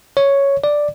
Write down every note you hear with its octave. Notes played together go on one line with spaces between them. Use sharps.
C#5
D5